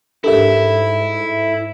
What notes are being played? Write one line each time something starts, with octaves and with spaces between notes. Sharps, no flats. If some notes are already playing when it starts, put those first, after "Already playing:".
G#2 D4 E4 G4 A4 A#4 E5